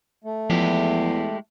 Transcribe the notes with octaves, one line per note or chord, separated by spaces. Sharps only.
A3
E2 F3 G#3 E4 G4